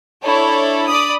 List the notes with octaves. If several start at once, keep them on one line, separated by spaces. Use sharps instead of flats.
D4 E4 A4 C#5
D5 B5 D#6